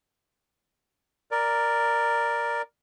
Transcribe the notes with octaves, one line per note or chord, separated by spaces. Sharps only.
A#4 D5